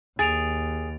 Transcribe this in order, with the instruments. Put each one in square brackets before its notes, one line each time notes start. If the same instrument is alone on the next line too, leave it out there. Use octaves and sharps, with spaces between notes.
[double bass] D#2 [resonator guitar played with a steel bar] G#4 [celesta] A6 D7 F7